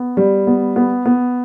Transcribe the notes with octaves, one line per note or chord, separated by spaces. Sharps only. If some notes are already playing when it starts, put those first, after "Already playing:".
Already playing: B3
G3
B3
B3
B3